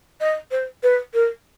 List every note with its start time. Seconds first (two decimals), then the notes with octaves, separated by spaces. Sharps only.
0.20 D#5
0.51 C5
0.83 B4
1.13 A#4